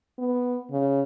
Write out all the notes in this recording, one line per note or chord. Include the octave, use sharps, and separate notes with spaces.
B3
C#3